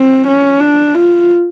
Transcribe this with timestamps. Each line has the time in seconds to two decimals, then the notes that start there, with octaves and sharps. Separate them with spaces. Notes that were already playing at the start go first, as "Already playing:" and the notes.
Already playing: C4
0.27 C#4
0.60 D4
0.95 F4